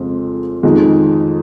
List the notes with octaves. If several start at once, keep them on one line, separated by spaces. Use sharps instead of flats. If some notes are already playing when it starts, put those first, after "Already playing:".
Already playing: F2 C#3 G#3 C4
F2 D#3 G#3 D#4